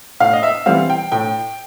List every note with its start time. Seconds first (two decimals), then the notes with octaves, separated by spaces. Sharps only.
0.20 A2 F5
0.33 D#5
0.43 E5
0.66 E3 G3 C4 F5
0.90 G5
1.12 A2 G5